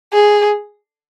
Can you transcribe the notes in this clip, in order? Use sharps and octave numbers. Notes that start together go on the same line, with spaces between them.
G#4